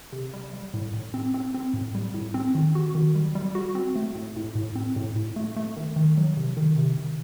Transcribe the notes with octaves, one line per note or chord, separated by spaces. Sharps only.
C3
G3
G3
A2
A2
C4
C4
C4
A2
G3
A2
C4
D#3
F#4
D#3
G3
G3
F#4
C4
A3
A2
A2
A2
C4
A2
A2
A3
A3
D#3
D#3
F#3
C3
D#3
C3
D#3